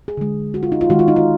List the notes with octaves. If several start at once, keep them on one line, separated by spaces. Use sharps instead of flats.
G#4
D3 G#3
F#4
F4
D#4
F4
D#3 G#3 F#4
F4
D#4
F4